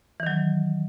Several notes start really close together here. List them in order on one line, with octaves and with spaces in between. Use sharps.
E3 D#3 F#3